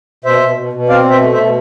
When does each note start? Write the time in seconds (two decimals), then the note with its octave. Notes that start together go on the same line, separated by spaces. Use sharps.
0.25 B2 C5 E5
0.41 B2
0.57 B2
0.73 B2
0.89 C4 D5 F5
1.05 B2
1.10 C5 E5
1.21 A3
1.32 C5 E5
1.37 B2